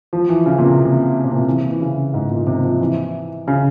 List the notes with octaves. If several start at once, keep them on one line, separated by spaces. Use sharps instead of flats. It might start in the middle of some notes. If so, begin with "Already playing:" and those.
F3
E3
C#3
A#2
C3
C3
C3
A#2
C3
E3
E3
C#3
G#2
A#2
C3
F3
E3
C#3